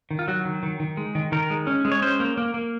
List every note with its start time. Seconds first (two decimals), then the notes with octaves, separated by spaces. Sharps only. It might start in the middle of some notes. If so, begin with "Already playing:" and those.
0.11 D#3
0.19 F4
0.28 F#3 F#4
0.45 D#3
0.63 D#3
0.80 D#3
0.97 G#3
1.15 D#3
1.32 D#3 A#4
1.50 G#3
1.67 C#4
1.85 G#3
1.92 C#5
2.02 C#4 C5
2.20 A#3
2.37 A#3
2.54 A#3